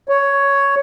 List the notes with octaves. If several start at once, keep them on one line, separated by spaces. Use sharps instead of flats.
C#5